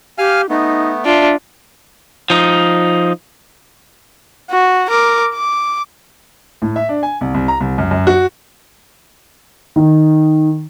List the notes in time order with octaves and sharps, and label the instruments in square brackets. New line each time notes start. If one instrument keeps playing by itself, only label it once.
[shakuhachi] G4 [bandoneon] F5 G#5 F6
[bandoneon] A3 B3 [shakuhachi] D#4
[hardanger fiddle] D4 F4 [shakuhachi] E5
[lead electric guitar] F3 D#4
[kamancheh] F#4
A#4 D6
D6
[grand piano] A2
E5
D4
G#5
C2
C2
A#5
C2
F#2
F#2
F#4
D#3